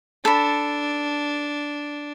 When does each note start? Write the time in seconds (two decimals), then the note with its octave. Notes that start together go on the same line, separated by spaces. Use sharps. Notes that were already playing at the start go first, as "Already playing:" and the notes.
0.25 D4 A4 B5